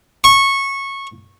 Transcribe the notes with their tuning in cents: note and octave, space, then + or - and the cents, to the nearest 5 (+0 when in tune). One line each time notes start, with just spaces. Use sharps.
C#6 -15